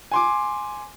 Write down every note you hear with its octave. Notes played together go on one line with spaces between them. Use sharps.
G#5 C6 D6